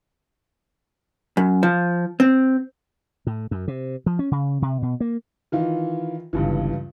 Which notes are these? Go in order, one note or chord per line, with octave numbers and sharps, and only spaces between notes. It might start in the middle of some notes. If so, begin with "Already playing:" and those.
F#2
F3
C4
A2
F#2
C3
F3
C#4
C#3
C3
B2
A#3
D#3 E3 F4
G1 C#2 G2 E3